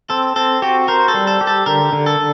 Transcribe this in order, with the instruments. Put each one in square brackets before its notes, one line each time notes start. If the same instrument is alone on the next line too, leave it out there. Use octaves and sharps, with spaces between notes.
[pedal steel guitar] C4 [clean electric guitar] A4
[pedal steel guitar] C4 [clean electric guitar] A4
[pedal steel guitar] F#4 [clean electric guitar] G4
[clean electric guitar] A#4 [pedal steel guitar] C5
[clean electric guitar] A4
[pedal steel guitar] G3
[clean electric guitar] A4
[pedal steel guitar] G4
[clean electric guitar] A4
[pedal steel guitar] D3 [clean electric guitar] A#4
[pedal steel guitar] D3
[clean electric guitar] A4